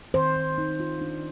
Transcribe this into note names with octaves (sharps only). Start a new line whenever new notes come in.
D#3 C5
D#3
D#4
F4
D4